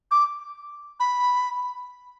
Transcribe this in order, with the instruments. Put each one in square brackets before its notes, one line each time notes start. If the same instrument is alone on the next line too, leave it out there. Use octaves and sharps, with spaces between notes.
[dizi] D6
B5